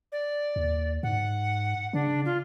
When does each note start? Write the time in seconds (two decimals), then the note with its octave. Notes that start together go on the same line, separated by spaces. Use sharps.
0.12 D5
0.56 D#2
1.03 G#2 F#5
1.93 C#3 D4
2.25 F4